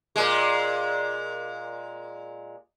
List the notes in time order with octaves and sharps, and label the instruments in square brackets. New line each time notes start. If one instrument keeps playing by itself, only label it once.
[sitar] A#2 G#3